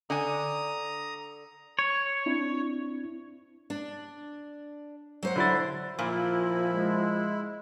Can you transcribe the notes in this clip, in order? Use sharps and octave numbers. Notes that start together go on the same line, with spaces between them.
D3 G#5 A#5 D#6
C#5
C4 D4 E4
D4
F#3 C5 F#5
D3 E4 A6
A#2 F3 E4
G#3